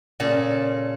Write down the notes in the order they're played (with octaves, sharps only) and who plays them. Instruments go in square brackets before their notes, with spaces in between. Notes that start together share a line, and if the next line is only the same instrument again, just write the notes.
[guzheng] A#2 C#3 A4